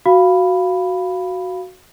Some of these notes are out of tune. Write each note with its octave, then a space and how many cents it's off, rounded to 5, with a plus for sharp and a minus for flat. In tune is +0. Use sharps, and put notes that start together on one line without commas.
F#4 +0 F5 -10 B5 +0